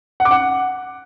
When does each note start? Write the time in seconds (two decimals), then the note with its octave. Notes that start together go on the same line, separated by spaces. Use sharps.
0.20 F#5
0.25 D6
0.31 F#5